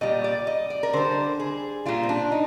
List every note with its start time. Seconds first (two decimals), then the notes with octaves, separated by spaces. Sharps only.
0.01 A#2 G3 D#5
0.24 D5
0.47 D#5
0.70 D5
0.83 A#4
0.93 D3 G3 C5
1.40 G#4
1.86 A#2 G3 F4
2.03 C4
2.09 D4
2.32 D#4